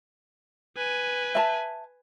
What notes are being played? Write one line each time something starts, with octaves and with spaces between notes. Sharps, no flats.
B4 G#5
E5 A5